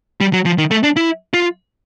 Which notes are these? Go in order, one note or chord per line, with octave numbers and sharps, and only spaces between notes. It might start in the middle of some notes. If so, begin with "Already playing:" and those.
G3
F#3
F3
D#3
A3
D4
E4
F4